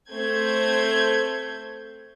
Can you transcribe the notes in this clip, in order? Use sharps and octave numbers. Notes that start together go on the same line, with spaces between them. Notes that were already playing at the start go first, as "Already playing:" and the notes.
A3 C4 C5 G6 G#6